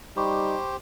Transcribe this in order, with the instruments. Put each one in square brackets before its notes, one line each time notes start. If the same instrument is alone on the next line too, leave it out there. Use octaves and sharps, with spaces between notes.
[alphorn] G3 [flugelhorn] D#4 [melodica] G4 C5 [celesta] B5 C#6 D6